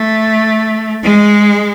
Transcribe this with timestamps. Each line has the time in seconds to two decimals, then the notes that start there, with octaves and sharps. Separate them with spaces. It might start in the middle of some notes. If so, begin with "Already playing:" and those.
Already playing: A3
1.03 G#3